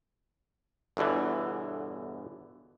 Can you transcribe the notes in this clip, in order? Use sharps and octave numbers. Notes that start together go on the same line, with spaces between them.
G1 E2 B2 D3 E3